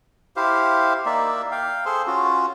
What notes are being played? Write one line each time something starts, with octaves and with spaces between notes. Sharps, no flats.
E4 G4 C5 F5
A#3 D#4 D5 E5
F5 G5
G#4 A4 C5 C6
C#4 F4 F#4